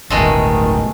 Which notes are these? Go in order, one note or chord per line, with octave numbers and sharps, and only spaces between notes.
D1 G1 B2 D#3 G#3 A3